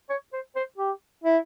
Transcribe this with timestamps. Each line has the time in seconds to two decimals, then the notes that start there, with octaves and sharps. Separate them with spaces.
0.09 C#5
0.33 C5
0.56 C5
0.77 G4
1.24 E4